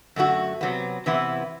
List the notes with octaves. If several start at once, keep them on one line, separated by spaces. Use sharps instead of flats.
F#2 D3 A3 D4 F#4
C3 F#3 B3
C3 E3 B3 E4